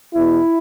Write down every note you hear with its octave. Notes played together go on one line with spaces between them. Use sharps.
E2 B2 E4